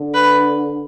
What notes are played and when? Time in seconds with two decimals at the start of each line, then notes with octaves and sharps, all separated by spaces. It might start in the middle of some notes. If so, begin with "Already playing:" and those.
Already playing: D3
0.14 B4